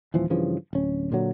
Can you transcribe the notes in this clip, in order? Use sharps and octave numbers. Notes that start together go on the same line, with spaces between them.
D#1 E3 F3
G2 C#3 E3 F3
D1 C#4
A#2 D3 F#3